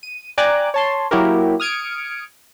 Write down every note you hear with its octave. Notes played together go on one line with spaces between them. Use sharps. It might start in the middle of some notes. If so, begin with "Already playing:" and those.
D#7
D5 G5 G#5 A#5 D6 F#6
C#5 A5 C6
F#3 A#3 E4 F#4 G4 A#4
D#6 F6 G#6 C#7 D7